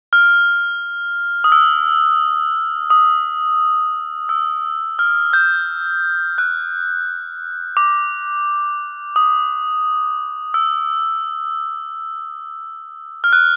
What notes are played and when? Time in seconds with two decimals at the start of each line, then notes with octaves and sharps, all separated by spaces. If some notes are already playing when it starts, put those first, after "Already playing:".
0.13 F6
1.44 D#6
1.52 E6
2.90 D#6
4.29 E6
4.99 F6
5.33 G6
6.38 F#6
7.77 D6
9.16 D#6
10.54 E6
13.24 F6
13.33 F#6